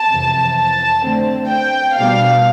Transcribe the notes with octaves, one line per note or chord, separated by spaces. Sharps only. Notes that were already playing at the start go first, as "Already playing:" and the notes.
Already playing: A5
F2 C3 E3
A5
D3 A3 C4
G5
B2 G3 D4 F5